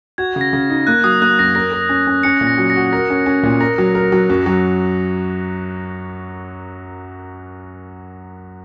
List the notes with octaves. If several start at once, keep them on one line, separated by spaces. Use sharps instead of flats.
F#4 G#6
C#3
A#6
C#3
D#4
A#3 F#6
F#3 D#6
A#3 F#6
F#2 A#6
A#4 A#6
A#4
C#4
C#4
C#4 C#7
A#2
A#6
F#3
A#6
F#4
A#4 A#6
C#4
C#4
A#2
A#4 A#6
F#3
A#4
F#3
F#2
F#3